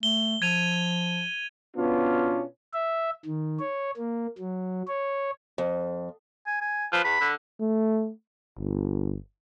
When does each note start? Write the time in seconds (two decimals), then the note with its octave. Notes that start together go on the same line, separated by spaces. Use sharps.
0.03 A3 G7
0.42 F3 G#6 D#7 F7
1.77 B2 B3 C#4 D4 F4
2.74 E5
3.26 D#3
3.60 C#5
3.97 A#3
4.38 F#3
4.88 C#5
5.58 F2
6.47 G#5
6.61 G#5
6.93 F3 B4
7.04 E2 B5
7.21 D3
7.61 A3
8.57 G1